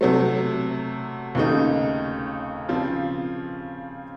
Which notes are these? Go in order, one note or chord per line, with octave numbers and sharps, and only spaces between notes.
C3 F#3 A3
D#2 C#3 A3 D#4
C#3 F3 C4 F4